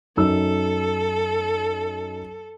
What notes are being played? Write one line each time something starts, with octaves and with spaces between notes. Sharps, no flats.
F#2 D#4 A4 E6